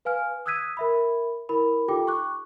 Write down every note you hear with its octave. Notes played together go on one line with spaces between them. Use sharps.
B4 F5 G#5 F6
D#6 E6 F#6 G#6 B6 D#7
A#4 E5 B5
E4 A#4 B5
D#4 F4 G4 A4 G5 D6
C#6 D6 F#6